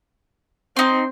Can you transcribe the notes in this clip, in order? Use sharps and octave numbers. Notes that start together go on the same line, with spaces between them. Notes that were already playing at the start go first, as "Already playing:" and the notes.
C4 D#4 C6